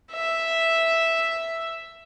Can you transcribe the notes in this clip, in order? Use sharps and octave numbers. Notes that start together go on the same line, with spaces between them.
E5